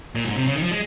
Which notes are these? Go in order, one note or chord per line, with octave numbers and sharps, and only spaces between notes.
A#2
G#2
C3
C#3
D#3
F3
G#3